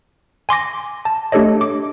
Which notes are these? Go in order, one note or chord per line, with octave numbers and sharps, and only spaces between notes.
G#5 C6 D6 A#6
A5
A3 D4 G4 A4 C#5 D#5
D6